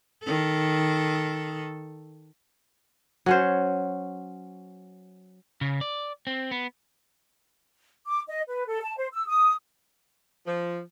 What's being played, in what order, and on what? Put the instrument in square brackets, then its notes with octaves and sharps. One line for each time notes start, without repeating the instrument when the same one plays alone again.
[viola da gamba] D#3 A4
[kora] F#3 C#4 C5
[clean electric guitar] C#3
D5
C4
B3
[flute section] D6
D#5
B4
A4
A5
C5
E6
D#6
[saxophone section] F3